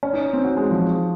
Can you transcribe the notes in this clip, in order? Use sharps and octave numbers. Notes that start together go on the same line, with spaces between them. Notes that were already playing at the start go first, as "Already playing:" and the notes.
C#4
D#4
C4
F#4
G#3
F3